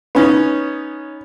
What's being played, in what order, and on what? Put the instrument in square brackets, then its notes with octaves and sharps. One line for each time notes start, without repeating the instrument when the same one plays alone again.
[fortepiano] B3 C#4 D#4